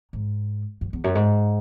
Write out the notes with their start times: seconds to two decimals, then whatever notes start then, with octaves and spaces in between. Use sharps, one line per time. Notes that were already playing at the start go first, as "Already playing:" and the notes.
0.13 G#2
0.81 F#2
0.93 E2
1.04 F#2
1.15 G#2